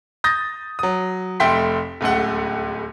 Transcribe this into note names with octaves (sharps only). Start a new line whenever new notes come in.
D#6 G6 A6 A#6
F#3 D#6
F1 A3 E5 G5 C6 B6
D1 C#2 A3 F#5